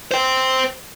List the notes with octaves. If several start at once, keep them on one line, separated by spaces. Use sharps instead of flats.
C5 G5